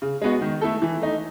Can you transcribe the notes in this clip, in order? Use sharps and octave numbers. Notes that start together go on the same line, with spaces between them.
C#3
G#3 B3 F#4
D#3
A3 E4 A4
E3
A3 D#4